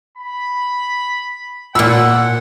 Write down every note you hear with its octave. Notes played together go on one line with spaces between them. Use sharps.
B5
A#2 F5 F#5 B5 E6